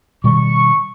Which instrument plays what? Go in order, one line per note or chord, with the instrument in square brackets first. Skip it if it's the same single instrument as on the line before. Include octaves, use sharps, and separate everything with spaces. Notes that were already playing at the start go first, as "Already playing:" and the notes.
[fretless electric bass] B2 D#3 G3 [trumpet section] C#6